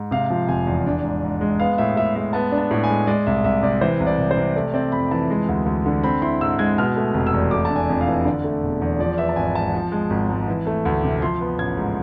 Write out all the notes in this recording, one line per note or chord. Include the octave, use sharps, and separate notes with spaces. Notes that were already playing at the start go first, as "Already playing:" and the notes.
Already playing: G#2
C3 F5
F3
F1 G#5
E2
D4
G#2
G#2
G#3
B3 F5
A2 E5
A2 E5
G#3 E5
B3 A5
D4
A5
A2
G#5
G#3
G#3 D5
C2 E5
C2 E5
C3 D5
E3 C5
C2
D5
C2
C5
C3
A3 D5
C4 D5
F2 B5
E3 A5
G#3
D2
D2
D3
C4 B5
E4 C6
G#2 E6
G#3 G#6
B2 F6
A3
F1
E6
E2
A3 D6
D4 A5
G#5
F2
F5
E3
D3 D5
A3
E1
E2
F3 D5
B3 E5
A5
G#1 G#5
G#2 A5
F3
G#3
G#1
G#2
E3
A3
D2
C3
F3 C6
B3
A1 G#6
G#2